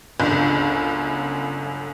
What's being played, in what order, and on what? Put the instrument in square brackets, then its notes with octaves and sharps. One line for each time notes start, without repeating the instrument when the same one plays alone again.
[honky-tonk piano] G1 C#2 F#2 D3